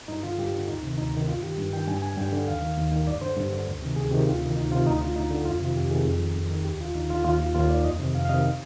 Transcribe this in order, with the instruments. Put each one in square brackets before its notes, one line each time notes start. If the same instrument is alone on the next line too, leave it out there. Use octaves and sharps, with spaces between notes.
[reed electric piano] G2 D#4
D3 F4
G2 G4
D3
D2 D#4
C3 D#3
D2 D#4
C3 D#3
G2 F4
D#3 G4
G2
D#3 G5
G2 G#5
D3 G#5
G2 G5
D3
D#2 F5
D#3
D#2
D#3
G2 D5
D3 C5
G2
D3
D2
C3 D#3
D2 G#4
C3 D#3 G4
D2 F4
C3
D#3
D2 D#4
C3 F4
D#3
D2 D#4
D3 F4
D2 D#4
D3
F2 F4
C3 D#3 F4
F2 G4
C3 D#3 G#4
F2
D#3
F2
D#3
D#2 G4
D3 F4
D#2 D#4
D3 F4
D#2 F4
D#3 F4
D#2 F4
D#3 D5
F2 D#5
C3 D#3
F2 F5
F5
C3 D#3 D#5